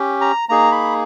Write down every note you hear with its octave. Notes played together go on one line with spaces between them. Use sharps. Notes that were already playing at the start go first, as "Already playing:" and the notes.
Already playing: C#4 G4
A#5
A#3 D#4 G#4 A#5
B5